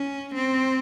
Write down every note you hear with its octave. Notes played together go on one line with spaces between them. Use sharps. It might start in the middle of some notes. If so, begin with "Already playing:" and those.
Already playing: C#4
C4